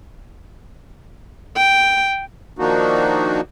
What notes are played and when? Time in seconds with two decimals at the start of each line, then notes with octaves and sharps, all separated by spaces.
1.57 G5
2.59 D#3 F3 A#3 D4 D#4 F#4